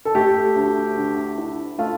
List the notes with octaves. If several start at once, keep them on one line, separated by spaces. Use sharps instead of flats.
A4
A3 G4
D2
D3
E4
A3 F4